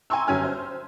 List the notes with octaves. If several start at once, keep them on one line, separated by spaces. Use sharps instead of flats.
G#5 A#5 C6 C#6 E6
G1 F#3 C#4 G#5 F6 G#6
C5